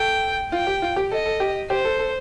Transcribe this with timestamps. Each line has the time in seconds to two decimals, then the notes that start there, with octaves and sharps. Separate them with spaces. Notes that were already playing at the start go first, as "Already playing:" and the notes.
Already playing: A4 G5
0.52 F4 G5
0.67 G4
0.82 F4
0.96 G4
1.11 A4 D#5
1.26 A4
1.40 G4
1.70 G4 C5
1.85 A4
1.99 A4